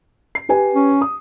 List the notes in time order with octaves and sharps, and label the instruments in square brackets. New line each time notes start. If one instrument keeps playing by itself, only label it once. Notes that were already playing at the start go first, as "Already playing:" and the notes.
[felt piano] C7
G4 B4 G#5
[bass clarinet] C#4
[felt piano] D#6